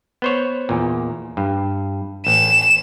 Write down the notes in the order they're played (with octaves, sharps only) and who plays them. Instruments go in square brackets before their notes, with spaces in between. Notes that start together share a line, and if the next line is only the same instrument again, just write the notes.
[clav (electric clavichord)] B3 C5 C#5
E2 A#2
G2
[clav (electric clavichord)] A1 [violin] E7